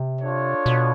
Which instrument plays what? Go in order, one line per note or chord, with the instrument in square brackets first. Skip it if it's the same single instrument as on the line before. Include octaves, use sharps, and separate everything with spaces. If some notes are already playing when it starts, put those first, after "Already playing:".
Already playing: [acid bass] C3
[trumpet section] D4 F4 A4 C#5
[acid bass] B2